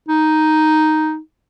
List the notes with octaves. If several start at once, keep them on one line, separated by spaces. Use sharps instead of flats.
D#4